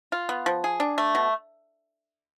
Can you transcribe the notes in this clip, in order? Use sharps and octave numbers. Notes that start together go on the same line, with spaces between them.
F4
B3
F3
G#4
D4
A3
B2